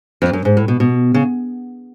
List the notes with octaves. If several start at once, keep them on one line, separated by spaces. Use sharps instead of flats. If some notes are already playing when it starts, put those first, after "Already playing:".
F2
F#2
G#2
A2
B2
B2
C#3